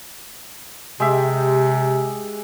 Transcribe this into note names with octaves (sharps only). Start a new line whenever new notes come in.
C3 G#3 G4 E5